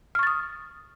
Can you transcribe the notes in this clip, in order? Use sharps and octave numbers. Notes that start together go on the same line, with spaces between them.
C#6 D#6 F6 A6